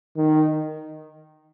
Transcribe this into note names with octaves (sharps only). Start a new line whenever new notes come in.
D#3